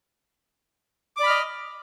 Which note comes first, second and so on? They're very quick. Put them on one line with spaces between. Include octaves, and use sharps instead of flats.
D6 D5 B5 F6 D#5